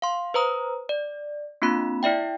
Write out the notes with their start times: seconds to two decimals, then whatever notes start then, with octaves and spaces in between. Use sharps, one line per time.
0.02 F5 C6
0.34 B4 C5 A#5 D#6
0.89 D5
1.62 A#3 C4 D4 F4 B5
2.03 E4 D5 E5 G5